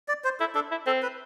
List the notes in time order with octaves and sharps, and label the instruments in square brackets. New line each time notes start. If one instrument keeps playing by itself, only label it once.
[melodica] D5
C5
[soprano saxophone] E4 [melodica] A4
[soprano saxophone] D4 [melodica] A4
[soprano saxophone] E4
[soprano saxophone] C4 [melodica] A4
[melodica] B4